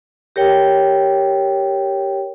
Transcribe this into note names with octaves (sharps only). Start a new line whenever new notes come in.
G4 A#4 C#5 G5